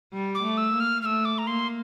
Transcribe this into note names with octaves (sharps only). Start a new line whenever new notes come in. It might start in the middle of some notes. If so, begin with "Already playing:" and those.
G3
D6
A3
E6
A#3
F6
A3 E6 F6
D6
A#5
A#3 C6